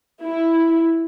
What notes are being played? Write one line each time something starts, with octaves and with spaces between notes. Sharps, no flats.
E4